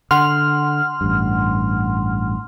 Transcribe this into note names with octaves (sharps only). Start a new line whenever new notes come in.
D3 F#5 C6 F6
A1 G2